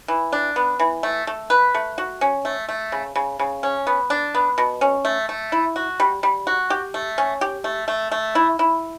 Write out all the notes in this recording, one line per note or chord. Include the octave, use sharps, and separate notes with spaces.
E3
D4
B3
E3
A3
A3
B4
A3
F#4
C#4
A3
A3
C#3
C#3
C#3
C#4
B3
D4
B3
B2
C#4
A3
A3
E4
F#4
G3
G3
F#4
G4
A3
C#4
G4
A3
A3
A3
E4
E4